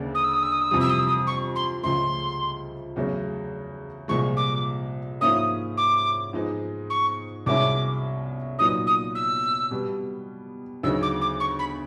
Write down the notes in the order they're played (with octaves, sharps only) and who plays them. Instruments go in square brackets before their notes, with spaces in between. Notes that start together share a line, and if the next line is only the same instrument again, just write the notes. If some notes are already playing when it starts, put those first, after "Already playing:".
Already playing: [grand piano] D2 C#3 A#3 D4
[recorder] D#6
E6
D#6
E6
D#6
E6
[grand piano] F2 C3 E3 G3 [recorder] D#6
[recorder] E6
D#6
E6
D#6
C#6
C6
[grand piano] C#2 C#3 F3 A3 [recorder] C6
[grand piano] E2 C#3 F#3 A3
[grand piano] C2 A#2 F3 G#3 [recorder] C#6
[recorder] D6
[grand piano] G#2 F3 A#3 C#4 E4 [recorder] D#6
[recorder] D6
[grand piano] G#2 F3 G#3 B3 D#4
[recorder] C#6
[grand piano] C2 B2 G#3 C#4 E4 [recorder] D6
[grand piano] A#2 F#3 B3 D#4 [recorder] D#6
[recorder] D#6
E6
[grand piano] B2 G3 B3
[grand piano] D2 C#3 F#3 B3 D#4 [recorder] E6
[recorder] D6
D6
C#6
B5